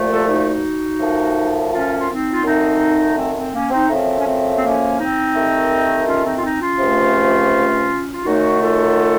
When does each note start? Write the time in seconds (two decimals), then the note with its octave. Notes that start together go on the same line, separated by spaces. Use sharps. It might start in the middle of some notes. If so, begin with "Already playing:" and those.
Already playing: C2 A#2 F3 A3
0.08 F4 A4
0.26 D#4 F#4
0.99 F#2 F3 A3
1.71 C#4 F4
1.96 F4
2.07 C4 D#4
2.33 F4
2.44 F#2 D#3 A3 C4 D#4
3.16 C4
3.34 C4
3.52 A#3 C#4
3.70 C4 D#4
3.88 F#2 F3 A3 C4
4.17 C#4
4.26 C4
4.57 C4
4.61 A#3 C#4
4.97 C4 D#4
5.34 D#2 D#3 A3
6.07 C#4 F4
6.24 C4 D#4
6.36 F4
6.42 C4 D#4
6.60 C#4 F4
6.79 C#2 C3 F3 A3
8.12 F4
8.23 F#2 D#3 F#3 A3 D#4 F#4
8.60 F4 A4